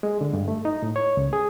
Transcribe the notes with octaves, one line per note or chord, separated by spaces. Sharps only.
G#3
D3
G2
A3
D#4
A2
C#5
C#2
G#4